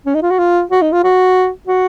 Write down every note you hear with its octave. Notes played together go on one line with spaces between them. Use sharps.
C#4
D#4
F4
F#4
F4
F#4
D#4
F4
F#4
F#4